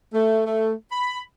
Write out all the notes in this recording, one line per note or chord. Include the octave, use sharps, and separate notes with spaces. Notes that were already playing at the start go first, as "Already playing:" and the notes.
A3
A3
B5